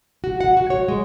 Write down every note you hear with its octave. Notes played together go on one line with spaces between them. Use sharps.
F#4
F#5
F#4
C#5
G#3